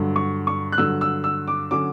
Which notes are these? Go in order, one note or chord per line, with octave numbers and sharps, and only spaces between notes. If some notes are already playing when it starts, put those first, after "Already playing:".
Already playing: G2 D3 F#3
C#6
C#6
F#6
G2 D3 F#3 E6
E6
E6
D6
D3 F#3 C#4 D6